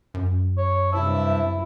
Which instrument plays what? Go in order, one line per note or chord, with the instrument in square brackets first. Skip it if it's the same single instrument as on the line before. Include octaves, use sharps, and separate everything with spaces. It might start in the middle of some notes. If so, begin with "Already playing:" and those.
[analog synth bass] F#2
[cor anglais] C#5
[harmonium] G2 C3 A5 [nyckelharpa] E4 [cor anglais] E5